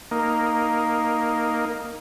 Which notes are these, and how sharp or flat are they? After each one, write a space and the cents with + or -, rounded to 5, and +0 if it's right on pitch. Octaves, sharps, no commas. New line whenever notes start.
A#3 +0 D#4 +0